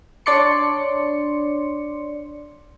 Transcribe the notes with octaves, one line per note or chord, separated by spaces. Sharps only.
D4 C#5 D5 C6 C#7